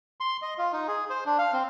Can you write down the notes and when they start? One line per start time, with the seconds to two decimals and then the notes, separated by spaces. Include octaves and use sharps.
0.20 C6
0.42 D#5
0.58 F4
0.73 D#4
0.88 G#4
1.10 C5
1.26 D4
1.38 F5
1.53 C4